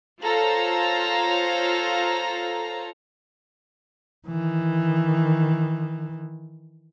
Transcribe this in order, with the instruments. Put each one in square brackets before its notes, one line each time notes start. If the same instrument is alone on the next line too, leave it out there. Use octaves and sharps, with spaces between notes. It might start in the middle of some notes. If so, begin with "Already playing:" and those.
[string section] F4 A4 C5 C#5 F5 A#5
[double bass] D#3 E3